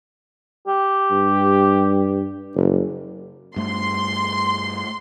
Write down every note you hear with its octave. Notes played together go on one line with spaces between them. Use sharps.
G4
G2
F#1
G2 A3 C6